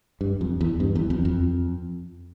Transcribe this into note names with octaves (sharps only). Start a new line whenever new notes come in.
G2
F2
E2
G2
E2
F2
F2